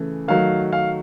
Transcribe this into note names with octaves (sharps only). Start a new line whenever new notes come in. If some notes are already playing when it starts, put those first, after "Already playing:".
Already playing: C#3 E3 A3
D#3 F#3 A3 F5
F5